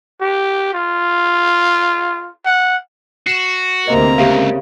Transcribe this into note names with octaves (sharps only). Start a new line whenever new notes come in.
G4
F4
F#5
F#4 C7 E7
D2 C3 A#3 C4 D#5 A#5
C#2 C#3 G4 E5 F5